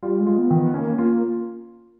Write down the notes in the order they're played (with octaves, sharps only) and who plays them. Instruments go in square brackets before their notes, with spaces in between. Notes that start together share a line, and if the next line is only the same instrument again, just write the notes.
[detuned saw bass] G3 [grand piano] F4
[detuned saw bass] G#3
[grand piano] F4
[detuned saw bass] B3
[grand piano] D#3
[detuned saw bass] B3
[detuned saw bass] A#3 [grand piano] C#4
[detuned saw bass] A#3 [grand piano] F4